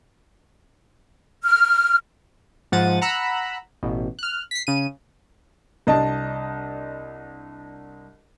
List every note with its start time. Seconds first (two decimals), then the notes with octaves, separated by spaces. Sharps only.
1.43 F6
2.72 G#2 F3 F#5 A6 D#7
3.01 F#5 A#5 B5 E6 F#6
3.83 A1 B2
4.19 F6 F#6
4.51 B6 C7
4.67 C#3 D#7
5.87 C2 D4 D#5 A5